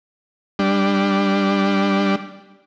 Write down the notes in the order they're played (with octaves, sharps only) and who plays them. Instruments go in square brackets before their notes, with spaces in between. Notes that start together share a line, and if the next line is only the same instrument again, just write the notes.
[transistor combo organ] G3 D4